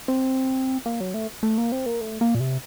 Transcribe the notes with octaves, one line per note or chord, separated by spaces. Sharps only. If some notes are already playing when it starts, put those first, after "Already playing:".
C4
A#3
F#3
A3
A3
A#3
C4
A#3
A3
A#3
A#2
C3